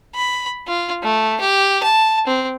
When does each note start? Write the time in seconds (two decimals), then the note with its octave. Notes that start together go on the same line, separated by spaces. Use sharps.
0.15 B5
0.67 F4
1.03 A3
1.40 G4
1.83 A5
2.27 C4